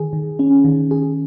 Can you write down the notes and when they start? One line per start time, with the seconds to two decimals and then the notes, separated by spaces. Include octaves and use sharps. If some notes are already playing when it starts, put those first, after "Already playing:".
Already playing: D#3 G#4
0.13 D#3
0.39 C#4
0.64 D#3
0.91 G#4